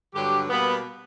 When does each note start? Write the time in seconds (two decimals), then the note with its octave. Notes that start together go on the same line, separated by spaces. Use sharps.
0.14 G2 D3 F#3 G4
0.50 B2 G3 A#3 B3